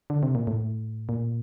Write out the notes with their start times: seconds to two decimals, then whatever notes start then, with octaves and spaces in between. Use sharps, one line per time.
0.10 D3
0.23 C3
0.35 A#2
0.47 A2
1.09 A#2